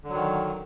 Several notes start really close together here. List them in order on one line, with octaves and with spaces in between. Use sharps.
D3 F#3 D#3